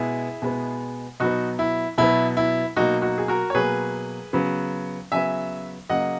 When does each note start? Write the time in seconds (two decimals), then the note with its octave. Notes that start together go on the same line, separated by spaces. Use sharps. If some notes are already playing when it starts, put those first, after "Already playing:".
Already playing: B2 G#3 B3 E4 G#4
0.42 B2 G#3 B3
1.20 B2 F#3 B3 D#4 F#4
1.59 E4
1.98 B2 F#3 B3 E4
2.37 E4
2.77 B2 F#3 A#3 D#4 F#4
3.02 D#4 F#4
3.18 G#4
3.28 F#4 A#4
3.50 C#5
3.54 B2 F#3 A#3 G#4 B4
4.33 C#3 F#3 B3
5.12 C#3 F#3 B3 E5 G#5
5.90 C#3 F#3 A#3 D#5 F#5